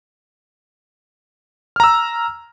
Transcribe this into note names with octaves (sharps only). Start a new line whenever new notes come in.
A#5 E6 F6